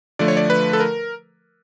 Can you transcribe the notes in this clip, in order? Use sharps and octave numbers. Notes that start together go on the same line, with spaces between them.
D3 F3 A3 D5
C#5
D5
B4
A4
A#4